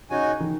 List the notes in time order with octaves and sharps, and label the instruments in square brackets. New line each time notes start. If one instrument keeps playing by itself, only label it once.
[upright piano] C#3 [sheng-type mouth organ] D#4 F#4 C#5 G#5
[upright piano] D#3